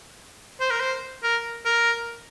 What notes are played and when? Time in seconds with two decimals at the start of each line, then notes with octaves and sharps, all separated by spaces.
0.60 C5
0.70 A#4
0.80 C5
1.23 A#4
1.65 A#4